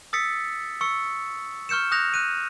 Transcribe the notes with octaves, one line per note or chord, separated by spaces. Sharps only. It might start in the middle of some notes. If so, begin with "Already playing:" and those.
D#6 E6 A6 B6 C#7
C#6 E6 C#7
C#6 F6 G6 C#7 E7
D#6 F#6 G6 A#6 F7
F#6 D#7